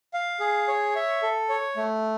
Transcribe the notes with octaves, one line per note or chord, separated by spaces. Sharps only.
F5
G#4
C#5
E5
A4
C#5
A3